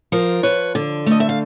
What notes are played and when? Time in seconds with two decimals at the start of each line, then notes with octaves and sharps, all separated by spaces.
0.12 F3 A#4 C5
0.43 F3 B4 C#5
0.75 D3
1.06 A3 D#5
1.20 E5
1.29 F5